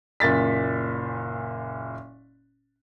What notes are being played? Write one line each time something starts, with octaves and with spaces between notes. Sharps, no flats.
F#1 A#2 A6 B6